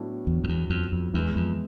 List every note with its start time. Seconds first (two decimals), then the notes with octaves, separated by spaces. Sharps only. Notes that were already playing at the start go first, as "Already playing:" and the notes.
Already playing: A2 F#3 B3 D4
0.27 E2
0.44 F2
0.49 E2
0.70 F2
0.92 F2
1.13 E2 E3 G#3 B3 E4
1.36 F2